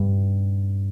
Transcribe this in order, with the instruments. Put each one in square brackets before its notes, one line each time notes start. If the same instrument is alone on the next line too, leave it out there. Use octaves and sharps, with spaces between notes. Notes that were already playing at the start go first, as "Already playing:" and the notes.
Already playing: [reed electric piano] G2